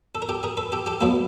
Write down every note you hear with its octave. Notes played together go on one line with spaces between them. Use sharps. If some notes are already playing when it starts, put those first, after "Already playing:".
A4
A#4
G4 A4
G#4 A#4
A4 B4
G4 A4
G4 A4
B2 F#3 A#3 A4 B4